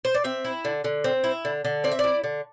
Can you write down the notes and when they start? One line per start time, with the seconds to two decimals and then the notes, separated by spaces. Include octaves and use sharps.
0.05 C5
0.14 D5
0.24 C4 E5
0.45 E4
0.65 D3
0.84 D3
1.04 C4
1.24 E4
1.45 D3
1.65 D3
1.84 C4 D5
1.91 E5
1.99 E4 D5
2.24 D3